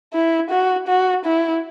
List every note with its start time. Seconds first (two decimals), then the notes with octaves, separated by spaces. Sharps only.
0.14 E4
0.50 F#4
0.88 F#4
1.25 E4